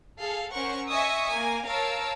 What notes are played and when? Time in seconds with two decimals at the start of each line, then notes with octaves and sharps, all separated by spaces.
0.19 G#4 A4 F5
0.51 C#4 A#4 C5 F#5 C#6
0.89 D#5 E5 G#5 C#6 D#6 E6
1.29 A#3 G#5
1.68 A#4 C#5 F5 A5 E6 D7